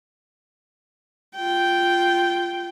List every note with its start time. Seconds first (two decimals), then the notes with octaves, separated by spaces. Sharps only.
1.36 F4 G5